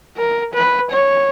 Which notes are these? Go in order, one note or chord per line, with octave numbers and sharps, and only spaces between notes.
A#4
B4
C#5